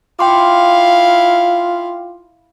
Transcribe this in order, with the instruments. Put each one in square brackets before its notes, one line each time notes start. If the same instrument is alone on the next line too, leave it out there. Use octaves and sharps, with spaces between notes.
[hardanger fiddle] E4 F5 [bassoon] F4 [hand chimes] G5 C6 D6